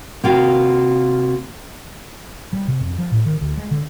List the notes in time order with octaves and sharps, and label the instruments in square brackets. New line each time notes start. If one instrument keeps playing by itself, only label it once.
[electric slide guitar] C3 F#4 [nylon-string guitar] A#3 F4 G5
[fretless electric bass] G3
C3
F2
F3
A2
D#3
D2
G#3
D3